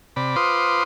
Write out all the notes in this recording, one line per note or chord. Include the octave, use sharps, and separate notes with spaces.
C3 D5 B5
F4 B4 C5 C6 D6 D#6